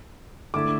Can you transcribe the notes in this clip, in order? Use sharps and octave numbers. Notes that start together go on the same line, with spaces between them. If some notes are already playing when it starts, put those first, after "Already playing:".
D3 A3 E4 D6